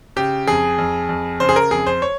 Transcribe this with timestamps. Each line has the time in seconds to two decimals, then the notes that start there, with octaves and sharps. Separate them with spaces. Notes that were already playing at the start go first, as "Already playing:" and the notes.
0.16 C#3 G4
0.47 F2 G#4
0.78 F2
1.09 F2
1.40 C#3 C5
1.49 G#4
1.56 A#4
1.71 F2 G#4
1.87 C5
2.02 C#5